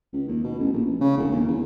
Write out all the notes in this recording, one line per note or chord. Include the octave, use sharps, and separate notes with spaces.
C#2
D#2
B2
A1
A#1
A1
C#3
E1
D#2
E2